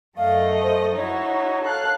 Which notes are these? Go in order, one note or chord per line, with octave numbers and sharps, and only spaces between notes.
F#2 A3 D#5 F5
C5
D#4 E4 F#4 C#5
A4 F5 F#6